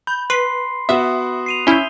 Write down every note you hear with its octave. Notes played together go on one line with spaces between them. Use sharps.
B5 G6
B4 C6 C7
B3 F#4 E5 D#6
C7 D#7 F7
C#4 E4 E5 G6 G7